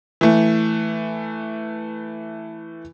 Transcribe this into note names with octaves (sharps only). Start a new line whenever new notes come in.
E3 A3